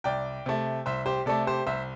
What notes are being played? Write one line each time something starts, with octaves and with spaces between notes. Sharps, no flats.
C2 D5 G5
C3 A3
C2 C5 E5
G4 C5
C3 A3 A4 D5
G4 C5
C2 C5 E5